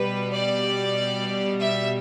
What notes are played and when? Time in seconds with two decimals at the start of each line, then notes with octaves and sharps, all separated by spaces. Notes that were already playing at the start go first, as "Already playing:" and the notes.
Already playing: B2 G3 B4
0.32 D5
1.60 E5